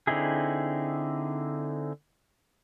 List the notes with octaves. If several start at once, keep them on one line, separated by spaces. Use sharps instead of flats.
D3 C4 D#4 E4 G#4